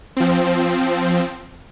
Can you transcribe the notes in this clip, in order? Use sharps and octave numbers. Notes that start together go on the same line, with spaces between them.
F3 C4